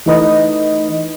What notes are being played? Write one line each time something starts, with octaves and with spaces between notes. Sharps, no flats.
E3 A3 D#4 B4 D#5